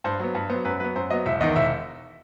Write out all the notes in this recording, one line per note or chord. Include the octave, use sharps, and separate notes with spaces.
G2 C5
F#3 B3
G2 B4
F#3 B3 C5
F#2 B4
F#3 B3 B4
F#2 C5
F#3 B3 D#5
E1 E5
E2 D#3 D#5
E1 E5